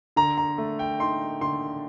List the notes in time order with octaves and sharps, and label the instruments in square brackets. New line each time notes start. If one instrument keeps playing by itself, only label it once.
[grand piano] D3 A#5
A#5
A3
G5
D#4 C6
D3 C6